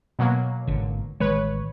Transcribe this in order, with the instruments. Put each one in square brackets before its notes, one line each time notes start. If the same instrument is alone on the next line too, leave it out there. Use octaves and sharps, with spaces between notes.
[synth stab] B2 F#3 A#3
[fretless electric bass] G#1 D3
[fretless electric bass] A1 D#3 G#3 [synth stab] B4 C#5